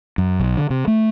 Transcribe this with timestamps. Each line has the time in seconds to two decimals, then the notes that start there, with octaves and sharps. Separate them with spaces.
0.18 F#2
0.40 B1
0.57 D3
0.70 C3
0.87 A3